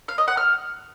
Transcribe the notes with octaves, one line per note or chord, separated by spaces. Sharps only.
F5
D#5
F#5
F6